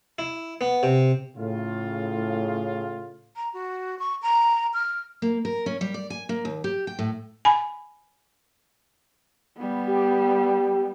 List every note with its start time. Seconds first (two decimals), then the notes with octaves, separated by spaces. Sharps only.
0.19 E4
0.61 B3
0.83 C3
1.36 A2 C#3 F4
3.36 A#5
3.53 F#4
3.99 C#6
4.22 A#5
4.74 F6
5.22 A#3
5.45 A#4
5.66 C#4
5.81 G3
5.94 D5
6.10 G#5
6.29 A#3
6.45 D#2
6.64 G4
6.87 G5
6.99 A2
7.45 G#5 B5
9.58 G3 B3
9.87 G4